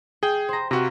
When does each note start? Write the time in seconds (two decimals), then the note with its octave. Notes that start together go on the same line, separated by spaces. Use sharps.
0.23 G#4 G5
0.49 C5 A#5
0.71 C3 F#4 B4 F5 A#5